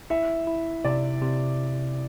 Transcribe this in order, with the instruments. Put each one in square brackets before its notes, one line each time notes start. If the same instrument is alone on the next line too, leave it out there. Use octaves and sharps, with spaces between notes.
[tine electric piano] E4 [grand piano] E5
[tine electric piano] E4
[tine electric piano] C3 [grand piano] D5
[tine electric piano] C3